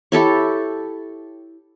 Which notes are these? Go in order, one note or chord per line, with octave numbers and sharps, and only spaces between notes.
E4 G4 A4 C#5